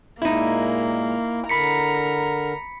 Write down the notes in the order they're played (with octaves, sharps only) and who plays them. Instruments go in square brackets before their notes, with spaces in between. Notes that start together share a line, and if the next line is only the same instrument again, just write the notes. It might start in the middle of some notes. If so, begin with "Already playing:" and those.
[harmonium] A#2 G#3 [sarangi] A#3 [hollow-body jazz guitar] D#4 E4
[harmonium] D3 A#4 [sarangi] A#5 [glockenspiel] B5 B6 C#7